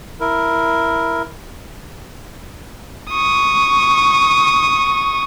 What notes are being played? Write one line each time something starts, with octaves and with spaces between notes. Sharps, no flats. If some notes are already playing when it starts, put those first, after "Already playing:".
E4 A#4
C#6 D#6